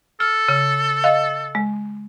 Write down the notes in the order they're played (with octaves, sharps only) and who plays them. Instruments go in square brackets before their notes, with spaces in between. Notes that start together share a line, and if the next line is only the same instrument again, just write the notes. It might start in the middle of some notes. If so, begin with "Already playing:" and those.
[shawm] A4 [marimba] F6
[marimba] C#3
D#5 F5
G#3